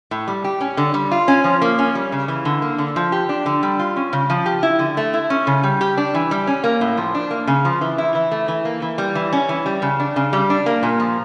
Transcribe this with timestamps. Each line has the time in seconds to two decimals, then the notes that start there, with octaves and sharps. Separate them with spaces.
0.11 A2
0.28 G3
0.44 G4
0.61 C#4
0.77 D3
0.94 G3
1.12 F4
1.28 C#4
1.44 F3
1.62 A#3
1.79 C#4
1.95 G3
2.12 C#3
2.28 E3
2.45 D3
2.62 A#3
2.78 D3
2.96 F3
3.12 G4
3.29 D4
3.46 D3
3.63 G3
3.79 F4
3.96 C#4
4.13 C#3
4.30 F3
4.46 G4
4.63 E4
4.79 D3
4.97 A3
5.14 E4
5.30 C#4
5.47 C#3
5.63 G3
5.81 G4
5.98 D4
6.14 E3
6.31 G3
6.47 C#4
6.64 A#3
6.81 A2
6.97 F3
7.15 D4
7.31 A#3
7.47 C#3
7.65 F3
7.81 E3
7.98 E4
8.15 E3
8.31 A3
8.48 E3
8.65 A#3
8.82 E3
8.98 G3
9.15 E3
9.33 C#4
9.49 E3
9.66 G3
9.82 C#3
10.00 D4
10.16 C#3
10.33 G3
10.50 D4
10.66 A#3
10.83 A#2
11.00 F3